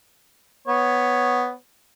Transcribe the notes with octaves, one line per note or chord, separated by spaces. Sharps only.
B3 C#5